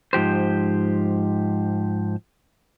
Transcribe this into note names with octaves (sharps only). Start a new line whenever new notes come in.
G#2 F3 G4 C5